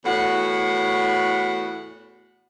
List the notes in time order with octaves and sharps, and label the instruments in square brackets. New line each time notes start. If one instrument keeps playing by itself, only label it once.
[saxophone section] E2 A2 F#4 F#5